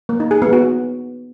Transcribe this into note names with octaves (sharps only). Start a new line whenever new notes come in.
A#3
D#4
G#4
B3
F#4